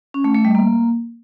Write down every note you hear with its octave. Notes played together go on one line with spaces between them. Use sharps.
C#4
A3
A3
G3
A#3